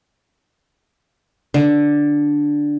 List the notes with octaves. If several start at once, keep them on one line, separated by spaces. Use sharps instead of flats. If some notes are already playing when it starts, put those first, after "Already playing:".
D3